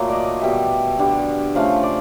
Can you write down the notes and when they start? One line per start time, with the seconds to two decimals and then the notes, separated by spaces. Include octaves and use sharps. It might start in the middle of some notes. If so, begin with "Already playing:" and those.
Already playing: A#2 F#3 A3
0.09 D5 D#5
0.42 B2 G3 E5
0.99 D3 G3
1.55 C#3 F3 A3 F5
1.83 D5